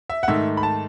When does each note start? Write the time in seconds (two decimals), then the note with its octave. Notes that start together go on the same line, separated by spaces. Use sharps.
0.10 E5
0.23 F#5
0.28 G#2 D#3 A3 E5
0.57 B5
0.63 A5